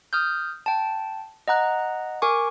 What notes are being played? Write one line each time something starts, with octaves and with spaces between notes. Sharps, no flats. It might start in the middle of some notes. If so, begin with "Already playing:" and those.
D#6 F6 G6
G5 A5
D#5 F#5 A#5 F#6
A#4 G#5 C#6 D6